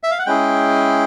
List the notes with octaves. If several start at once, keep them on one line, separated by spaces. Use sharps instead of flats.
E5
F5
F#5
G#3 C#4 E4 G#4 G5